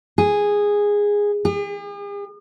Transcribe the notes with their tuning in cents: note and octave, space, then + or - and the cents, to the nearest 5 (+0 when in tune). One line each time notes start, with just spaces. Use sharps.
G#4 -10
G#4 -45